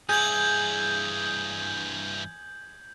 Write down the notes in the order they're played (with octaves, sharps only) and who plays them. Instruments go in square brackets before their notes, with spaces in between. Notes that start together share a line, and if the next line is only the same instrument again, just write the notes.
[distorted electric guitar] G2 E3 [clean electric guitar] G#4 [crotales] G6 G#6 F#7